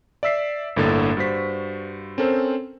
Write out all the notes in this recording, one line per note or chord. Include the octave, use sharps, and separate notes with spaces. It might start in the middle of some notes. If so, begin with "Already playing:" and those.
D5 E5 E6 B6 C7
G1 A2 D3 A#3 A6
G2 F#4 C5 B6
C4 C#4 A4 A#4 C5